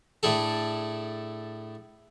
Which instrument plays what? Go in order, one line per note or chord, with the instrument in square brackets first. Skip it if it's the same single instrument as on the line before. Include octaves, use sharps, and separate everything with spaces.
[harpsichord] A2 D4 G#4 A4